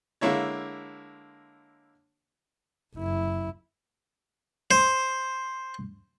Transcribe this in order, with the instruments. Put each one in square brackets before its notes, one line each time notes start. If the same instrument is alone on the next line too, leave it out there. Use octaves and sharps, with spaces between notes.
[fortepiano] D3 G#3 A#3 E4 C#5
[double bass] F#1 E4
[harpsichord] C5